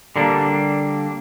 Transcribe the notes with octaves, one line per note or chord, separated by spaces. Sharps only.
D3 G3 A#3 D4